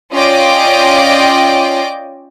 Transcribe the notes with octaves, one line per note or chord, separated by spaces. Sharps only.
C#4 F4 D5 D#5 G5 D6